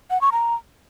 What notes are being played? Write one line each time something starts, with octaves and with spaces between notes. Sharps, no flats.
F#5
C#6
A#5